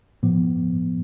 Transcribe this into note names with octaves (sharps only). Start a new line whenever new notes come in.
A2 F3 B3